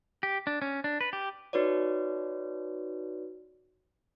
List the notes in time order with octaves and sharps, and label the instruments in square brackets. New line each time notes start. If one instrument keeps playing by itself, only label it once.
[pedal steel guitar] G4
D4
C#4
D4
B4
G4
[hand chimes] D#4 F#4 B4 C#5 D5